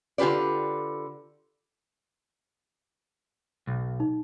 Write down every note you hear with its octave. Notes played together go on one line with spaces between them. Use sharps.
D3 F4 G4 B4 D5
B1
D#4